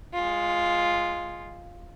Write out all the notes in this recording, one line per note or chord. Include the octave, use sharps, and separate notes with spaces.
G#3 F4